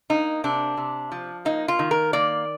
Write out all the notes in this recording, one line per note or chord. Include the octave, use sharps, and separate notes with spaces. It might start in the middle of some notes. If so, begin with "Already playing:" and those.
A#3 D#4
C3 D4
C3
F3
A#3 D#4
F4
D#3
A#4
A#3 D5